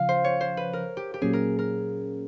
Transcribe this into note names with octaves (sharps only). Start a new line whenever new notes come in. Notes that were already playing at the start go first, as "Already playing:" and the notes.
Already playing: C#3 F3 F5
C5
C#5
C5
B4
A#4
G4
G4
A#2 F#3 A#3 C#4 G#4
A#4
A#4